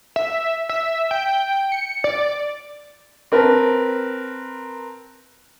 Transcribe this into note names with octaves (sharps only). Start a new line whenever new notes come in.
E5
E5
G5
C#7
D5
C4 A#4 B4 A5